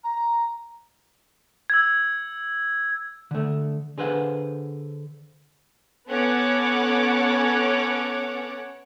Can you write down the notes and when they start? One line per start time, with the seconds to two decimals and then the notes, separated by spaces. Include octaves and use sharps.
0.04 A#5
1.70 E6 G#6
3.31 D3 A3
3.98 D3 G#4 B4 C5 F5 F#5
6.08 B3 C#4 A4 C#5 F#5 D6